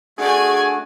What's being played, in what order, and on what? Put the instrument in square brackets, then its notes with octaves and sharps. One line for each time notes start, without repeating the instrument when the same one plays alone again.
[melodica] A3 F#4 [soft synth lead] D4 [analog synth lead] G#4 [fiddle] D5 G#5